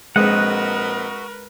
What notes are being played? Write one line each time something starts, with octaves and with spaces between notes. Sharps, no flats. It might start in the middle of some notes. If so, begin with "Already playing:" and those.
A#1 G#3 C4 F#4 A#4 B4 D#5 F#5